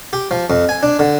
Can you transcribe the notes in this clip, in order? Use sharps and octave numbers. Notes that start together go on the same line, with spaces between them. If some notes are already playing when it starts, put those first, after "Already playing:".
G4
F3
F2
G#5
D4
D3